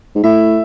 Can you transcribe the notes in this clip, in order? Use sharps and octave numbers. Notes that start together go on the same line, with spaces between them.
G#2
A2 E5